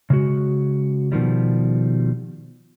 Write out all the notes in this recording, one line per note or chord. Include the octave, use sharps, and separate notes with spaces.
C#3 G#3 F#4
B2 D#3 F3 G3